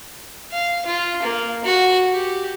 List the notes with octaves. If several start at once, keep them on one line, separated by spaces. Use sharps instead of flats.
F5
F4
A#3
F#4
G4